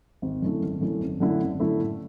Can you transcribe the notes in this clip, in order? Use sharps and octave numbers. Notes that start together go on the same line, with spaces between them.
G#1
F#2 D3 A3 E4
G#1
F#2 D3 A3 E4
G#1
F#2 D3 A3 E4
G#1
F#2 D3 A3 E4
A2